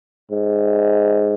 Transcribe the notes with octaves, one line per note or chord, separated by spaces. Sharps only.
G#2